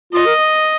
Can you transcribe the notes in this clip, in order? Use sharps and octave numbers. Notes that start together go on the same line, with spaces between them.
F4 D#5
A#4